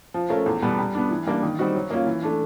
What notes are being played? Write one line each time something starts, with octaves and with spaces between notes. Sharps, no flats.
F3
A3 C#4 F4 A#4
E2
B2 G3 B3
G3
B3 D4
E3
G3 A#3 D4
D#3
G3 C4 D#4 F#4
F#3
A#3 C#4 F4
E3
A3 D4